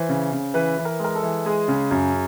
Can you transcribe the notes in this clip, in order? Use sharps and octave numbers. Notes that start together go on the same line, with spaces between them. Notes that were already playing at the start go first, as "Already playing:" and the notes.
Already playing: E3 C5
C#3
C#3
E3 B4
E3
A#4
G#3 A#4
A4
E3
G#3 G#4
C#3
F#2